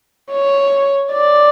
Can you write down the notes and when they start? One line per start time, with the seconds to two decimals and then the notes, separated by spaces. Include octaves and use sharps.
0.31 C#5
1.13 D5